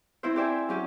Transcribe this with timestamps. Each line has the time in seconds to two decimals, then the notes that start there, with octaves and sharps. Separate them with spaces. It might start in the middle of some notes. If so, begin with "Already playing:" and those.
0.23 C4 E4 C5
0.36 G4 C5 D5 E5 G5 G#5
0.69 F#3 C#4 G4